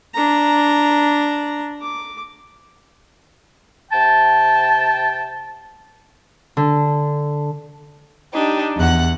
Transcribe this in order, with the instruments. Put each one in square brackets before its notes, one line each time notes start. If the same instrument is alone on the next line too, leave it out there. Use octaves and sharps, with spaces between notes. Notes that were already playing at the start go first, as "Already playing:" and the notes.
[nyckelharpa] D4 A#5
D6
[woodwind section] C3 G5 A5
[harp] D3
[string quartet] D4 D#4 G4
E2 F#5 F#6